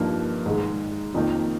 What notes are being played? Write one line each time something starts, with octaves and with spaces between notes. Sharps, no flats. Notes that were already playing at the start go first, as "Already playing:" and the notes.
Already playing: G2 F3 A#3 D#4
G#2 D#3 G#3
F2 D#3 A#3 D#4